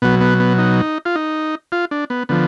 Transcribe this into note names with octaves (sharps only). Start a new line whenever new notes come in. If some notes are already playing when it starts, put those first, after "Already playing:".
B2 F#3 B3
B3
B3
D#4
F4
D#4
F4
D4
B3
D3 F3 B3